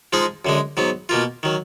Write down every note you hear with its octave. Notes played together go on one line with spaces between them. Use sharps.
F3 G#3 D#4 G#4
F#2 D3 G#3
G#2 F#3 B3
B2 A#3 F4
D#3 F#3